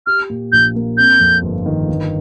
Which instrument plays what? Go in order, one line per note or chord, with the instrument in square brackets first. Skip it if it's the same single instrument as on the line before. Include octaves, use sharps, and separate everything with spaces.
[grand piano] G4 [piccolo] F6
[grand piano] A#2
[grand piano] A#1 [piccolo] G6
[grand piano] A#3
[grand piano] C4 [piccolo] G6
[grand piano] F2
G1
D#3
G1